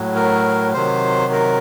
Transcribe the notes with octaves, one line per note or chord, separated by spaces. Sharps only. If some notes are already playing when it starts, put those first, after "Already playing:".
Already playing: A2 F#3
A#4
C3 D#3 F#3 C5
A#4